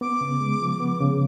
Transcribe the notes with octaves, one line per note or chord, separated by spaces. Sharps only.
B3 D6
C#3
G#3
F3
B3
C#3